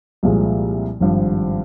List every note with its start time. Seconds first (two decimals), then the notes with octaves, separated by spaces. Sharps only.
0.23 C2 A#2 F3 G#3
1.00 G#1 G2 F3